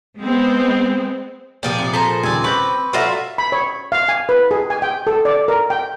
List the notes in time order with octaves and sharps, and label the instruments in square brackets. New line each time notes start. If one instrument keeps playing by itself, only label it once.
[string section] G#3 B3 C4
[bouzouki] A#2 F3 G#4 [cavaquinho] D5 G5
[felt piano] C3 C#7 [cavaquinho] D5
[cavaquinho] A4 C5 A#5 [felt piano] B6
[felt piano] D#1 D#2 C#3 [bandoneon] C4 [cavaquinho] D5 G#5
[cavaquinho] B4 D6 [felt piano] C#6 G6 A#6
[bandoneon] F#3 F5 [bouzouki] F4 F#4 E5 [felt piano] A4 D5
[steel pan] B5
C#5
F5
G#5
B4
G#4
G#5
G5
A4
D5
A#4
G5